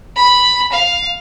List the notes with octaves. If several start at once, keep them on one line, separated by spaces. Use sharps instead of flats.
B5
F5